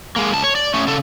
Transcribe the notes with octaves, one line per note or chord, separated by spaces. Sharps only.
G#3 A#3
C#2 A5
C#5
D5
A3 C#4
C#3 A4